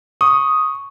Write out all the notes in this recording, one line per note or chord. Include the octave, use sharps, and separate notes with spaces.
C#6 D#6